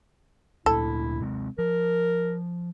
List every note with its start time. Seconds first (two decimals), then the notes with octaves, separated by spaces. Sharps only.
0.66 D2 A#2 D3 E4 A4
1.21 C3 G#3 C4
1.59 F3 A#4